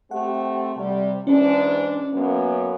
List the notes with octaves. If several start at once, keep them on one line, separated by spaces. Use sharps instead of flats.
A3 C4 G4 F#5
C3 G3
G#2 E3 C#4 D4
F#2 A#3 B3